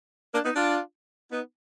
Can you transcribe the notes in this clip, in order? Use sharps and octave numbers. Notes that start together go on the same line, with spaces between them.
A#3 D4
B3 D#4
D4 F4
B3 D#4